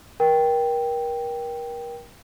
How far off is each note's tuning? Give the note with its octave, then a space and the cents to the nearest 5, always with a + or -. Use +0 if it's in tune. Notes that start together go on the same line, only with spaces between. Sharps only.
A#4 +30 G5 +0